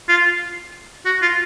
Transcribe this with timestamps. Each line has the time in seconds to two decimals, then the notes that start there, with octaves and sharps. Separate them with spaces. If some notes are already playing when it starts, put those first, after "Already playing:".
0.09 F4
1.06 F#4
1.22 F4